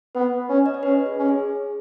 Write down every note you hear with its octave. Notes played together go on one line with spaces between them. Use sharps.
B3 B4
C#4
D#5
C#5
C#4 B4
G#4
C#4
G#4